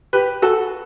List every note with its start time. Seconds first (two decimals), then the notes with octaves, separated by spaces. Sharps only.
0.13 G4 B4
0.42 F#4 A4